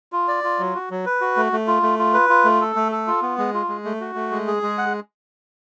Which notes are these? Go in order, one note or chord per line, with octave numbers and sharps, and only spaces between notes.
F4
D5
F4
F#3
F#4
F#3
B4
F#4
A3
A3
F4
A3
F4
B4
F4
A3
A4
A3
A4
F4
B3
G#3
F4
G#3
A3
F#4
A3
G#3
G#4
G#3
F#5